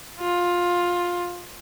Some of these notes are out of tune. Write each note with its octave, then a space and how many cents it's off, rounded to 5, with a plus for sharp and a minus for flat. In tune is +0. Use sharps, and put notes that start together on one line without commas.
F4 +15